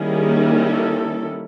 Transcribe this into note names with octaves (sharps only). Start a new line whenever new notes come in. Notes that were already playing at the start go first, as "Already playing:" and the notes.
Already playing: D#3 G3 A#3 C#4 E4 G#4
A4